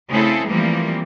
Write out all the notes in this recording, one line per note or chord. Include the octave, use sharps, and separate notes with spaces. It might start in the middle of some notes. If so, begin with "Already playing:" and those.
C#3 A3 C4 E4 G#4 A4
E3 F3 G3 A3 A#3 C4